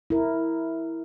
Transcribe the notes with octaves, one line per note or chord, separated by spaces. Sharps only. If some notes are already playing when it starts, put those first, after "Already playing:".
E4 A#4